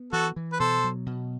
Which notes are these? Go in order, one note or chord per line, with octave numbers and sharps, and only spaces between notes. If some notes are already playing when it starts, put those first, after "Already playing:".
Already playing: B3
E3 F#4 A4
E3
B4
B2 A4 C5
F#3
B2